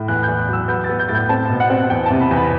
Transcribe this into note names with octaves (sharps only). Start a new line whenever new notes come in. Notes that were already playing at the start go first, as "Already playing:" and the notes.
Already playing: A2
E2 F#6
E2 G6
F#6
F#3 E6
B3 G6
A6
B3
G6
A2 A6
G6
C4 A5
B2
F#5
C4
E2 G5
C3 A5
B5
E2
B5